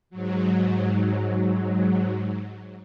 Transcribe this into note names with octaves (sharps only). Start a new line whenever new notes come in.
G#2 F#3